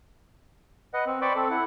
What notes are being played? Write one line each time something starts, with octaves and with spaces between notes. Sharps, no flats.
B4 D#5 F#5
C4
C5 D5 G5 B5 C#6 D6
C4 A4
E4 F#5